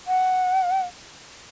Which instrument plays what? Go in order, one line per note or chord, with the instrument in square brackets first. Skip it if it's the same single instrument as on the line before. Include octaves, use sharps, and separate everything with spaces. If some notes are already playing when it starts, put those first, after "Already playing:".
[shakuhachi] F#5